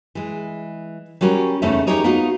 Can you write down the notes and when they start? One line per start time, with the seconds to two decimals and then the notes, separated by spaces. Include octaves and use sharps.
0.15 E3 G#3
1.21 F#3 G3 C#4 F#4 A#4
1.62 E2 C#3 A3 C#4 D#4 E5
1.87 D#4 G4 G#4 A#4 C#5 D#5
2.04 B3 D#4 F4 F#4